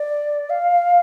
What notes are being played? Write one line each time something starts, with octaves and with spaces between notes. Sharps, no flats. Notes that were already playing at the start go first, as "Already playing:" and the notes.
Already playing: D5
F5